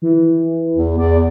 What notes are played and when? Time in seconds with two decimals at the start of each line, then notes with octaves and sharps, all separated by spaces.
0.02 E3
0.75 E2
0.98 E2 D5